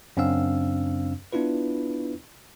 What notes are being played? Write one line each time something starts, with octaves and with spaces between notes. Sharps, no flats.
F#2 C#3 C4 D4 F5 E6
B3 D4 E4 F4 B4